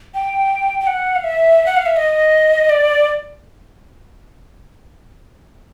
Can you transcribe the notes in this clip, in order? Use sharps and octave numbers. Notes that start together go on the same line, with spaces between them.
G5
G5
F#5
F5
E5
F#5
F5
E5
D#5
D5